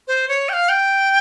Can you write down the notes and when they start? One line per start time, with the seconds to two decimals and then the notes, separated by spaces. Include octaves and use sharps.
0.08 C5
0.28 C#5
0.49 G5
0.53 F5
0.69 G5